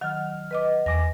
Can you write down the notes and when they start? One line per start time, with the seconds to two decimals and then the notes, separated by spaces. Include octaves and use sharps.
0.01 D#3 F#3 F#5 F6
0.51 B4 D#5 D6
0.86 E2 G#5 D6 A#6